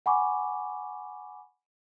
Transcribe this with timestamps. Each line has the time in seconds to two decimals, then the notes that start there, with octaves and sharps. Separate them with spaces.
0.06 F#5 G#5 B5 C#6 D6